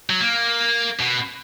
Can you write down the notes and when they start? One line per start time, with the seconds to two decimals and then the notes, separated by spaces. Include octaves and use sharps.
0.10 F#3
0.20 A#3
1.01 B2